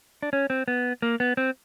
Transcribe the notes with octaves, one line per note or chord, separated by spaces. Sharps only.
D4
C#4
C4
B3
A#3
B3
C4